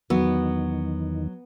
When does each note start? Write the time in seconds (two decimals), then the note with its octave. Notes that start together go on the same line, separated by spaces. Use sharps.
0.10 E2 D#3 F#3 B3